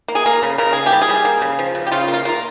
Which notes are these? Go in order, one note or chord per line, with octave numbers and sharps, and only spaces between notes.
A#3
G#4
A#3 A#4
C#3
C#3 A#4
A#3 G#4
G4
G3
G#4
G3
A#3
C#3
F3
C#3
G4
C#3 F4
A#3
F4
A#3 A#4